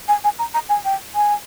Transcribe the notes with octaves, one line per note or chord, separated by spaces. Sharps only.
G#5
G#5
A#5
A#5
G#5
G5
G#5